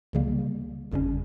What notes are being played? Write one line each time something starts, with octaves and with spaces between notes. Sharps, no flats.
C#2 C#3 G3 A#3
G1 F2 C#3 G3 C#4